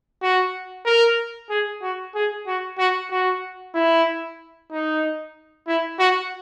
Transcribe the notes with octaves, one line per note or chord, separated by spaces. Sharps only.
F#4
A#4
G#4
F#4
G#4
F#4
F#4
F#4
E4
D#4
E4
F#4